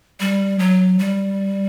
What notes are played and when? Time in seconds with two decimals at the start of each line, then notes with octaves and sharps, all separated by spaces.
0.20 G3
0.59 F#3
0.99 G3